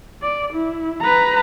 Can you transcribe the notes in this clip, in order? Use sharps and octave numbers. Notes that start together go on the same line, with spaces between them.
D5
E4
B4 A#5